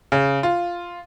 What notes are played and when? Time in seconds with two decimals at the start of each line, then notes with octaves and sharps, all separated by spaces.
0.12 C#3
0.43 F4